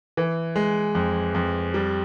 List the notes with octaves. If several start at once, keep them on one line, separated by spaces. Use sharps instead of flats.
E3
G#3
F2
F2
G3